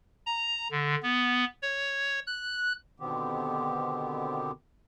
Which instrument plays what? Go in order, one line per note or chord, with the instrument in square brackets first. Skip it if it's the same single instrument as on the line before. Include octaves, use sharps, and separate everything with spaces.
[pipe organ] A#5
D3
B3
C#5
F#6
[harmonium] B2 D3 D#3 B3 C4 G4